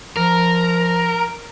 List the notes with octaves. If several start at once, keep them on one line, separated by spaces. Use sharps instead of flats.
F3 A#4